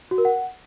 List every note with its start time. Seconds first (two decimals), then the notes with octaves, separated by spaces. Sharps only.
0.11 F#4
0.18 A#4
0.25 F#5